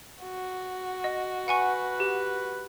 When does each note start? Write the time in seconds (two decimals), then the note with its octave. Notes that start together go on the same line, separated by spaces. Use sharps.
0.22 F#4
1.04 D#5
1.48 B4 F#5 G#5 C#6
2.00 G4